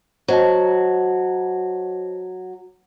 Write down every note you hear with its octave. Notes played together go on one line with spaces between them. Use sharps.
F#3 C5 D#5 A5